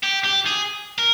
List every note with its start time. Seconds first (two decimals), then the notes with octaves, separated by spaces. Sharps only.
0.03 G4
0.24 G4
0.46 G#4
0.99 A#4